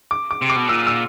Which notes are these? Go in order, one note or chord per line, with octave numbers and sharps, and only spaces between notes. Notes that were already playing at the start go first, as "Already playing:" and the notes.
D6
D6
C3
D6
B2
A#2 E6
E6